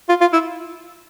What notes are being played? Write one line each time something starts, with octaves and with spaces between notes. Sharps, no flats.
F4
F4
E4